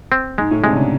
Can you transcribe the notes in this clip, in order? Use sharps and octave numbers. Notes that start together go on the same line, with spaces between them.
C4
G#2 G#3
A2
C3 G#3
D3
C#3